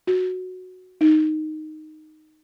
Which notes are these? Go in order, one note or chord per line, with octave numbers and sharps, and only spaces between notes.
F#4
D#4